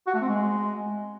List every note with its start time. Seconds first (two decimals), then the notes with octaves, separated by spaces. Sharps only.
0.07 F#4
0.14 A3
0.21 C4
0.29 G#3